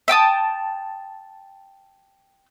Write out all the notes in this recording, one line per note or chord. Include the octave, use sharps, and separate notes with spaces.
E5 G5 A5 D#6